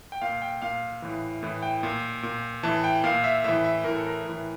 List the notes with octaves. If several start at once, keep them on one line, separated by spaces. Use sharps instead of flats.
G5
A#2 F5
G5
A#2 F5
A2 E3
A2 E3
G5
A#2
A#2
A2 E3 A5
G5
A#2 F5
E5
A2 E3 E5
E5
A2 E3 A#4
A4
A#4
A2 E3